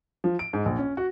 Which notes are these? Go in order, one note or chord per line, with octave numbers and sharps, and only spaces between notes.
F3
D7
G#2
A#1
C#4
F#4